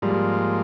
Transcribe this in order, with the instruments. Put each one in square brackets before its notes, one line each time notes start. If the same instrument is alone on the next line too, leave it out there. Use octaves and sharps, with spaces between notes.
[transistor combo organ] G#2 F3 A#3 [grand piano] G3